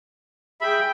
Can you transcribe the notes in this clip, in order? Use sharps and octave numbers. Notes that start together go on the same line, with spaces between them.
G#4 E5 G5 B5